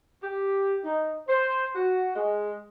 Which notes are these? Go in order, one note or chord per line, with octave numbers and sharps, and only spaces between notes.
G4
D#4
C5
F#4
G#3